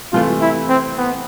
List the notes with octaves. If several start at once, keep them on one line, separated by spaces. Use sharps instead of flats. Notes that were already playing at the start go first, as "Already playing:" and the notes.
C3 E3 A3 F4
E4
C4
B3